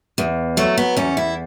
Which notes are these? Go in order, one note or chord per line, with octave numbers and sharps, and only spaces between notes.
E2
F#3 A3
B3
E2 C#4
E4